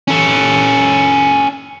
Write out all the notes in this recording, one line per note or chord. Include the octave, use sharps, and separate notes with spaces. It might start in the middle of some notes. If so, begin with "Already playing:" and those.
C#4 A4